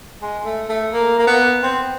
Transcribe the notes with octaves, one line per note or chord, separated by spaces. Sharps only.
G#3
A3
A3
A#3
A#3
B3
C4